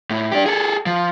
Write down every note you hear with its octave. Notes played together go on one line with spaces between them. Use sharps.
A2
D4 G4
G#4 A4
F3